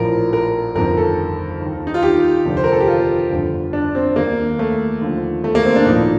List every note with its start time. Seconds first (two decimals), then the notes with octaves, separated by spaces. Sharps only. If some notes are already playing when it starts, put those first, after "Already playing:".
Already playing: A#1 A2 F3 A#4
0.33 A#4
0.75 G1 F2 D#3 A#4
0.97 A4
1.61 D#2 D#3
1.87 D#4
1.94 F4
2.03 G4
2.45 F1 D#2 D3 F3
2.57 C5
2.64 A#4
2.72 A4
2.81 G4
2.88 F4
3.31 G1 F2 D3
3.73 D4
3.95 C4
4.16 D#2 D#3 A#3
4.59 A3
5.01 D#2 D3 F3
5.44 A3
5.55 A#3
5.65 C4
5.76 D4
5.86 A#1 A2 F3 D#4